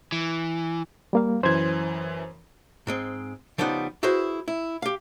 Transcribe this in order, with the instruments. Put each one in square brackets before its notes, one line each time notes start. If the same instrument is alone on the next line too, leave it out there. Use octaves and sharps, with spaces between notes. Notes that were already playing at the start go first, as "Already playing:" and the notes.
[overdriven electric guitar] E3
[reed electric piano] G3 A#3 F5
[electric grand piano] F#2 E3 [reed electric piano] C5 G#6
[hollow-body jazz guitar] G#2 G#3 C4
C#3 F3 G3 B3 D#4 F#5
E4 F#4 G#4 B4 C5 E5
E4
G4 F5